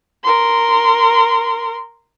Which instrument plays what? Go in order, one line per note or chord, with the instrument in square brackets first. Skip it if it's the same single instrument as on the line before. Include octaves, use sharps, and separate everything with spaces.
[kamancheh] A#4 C6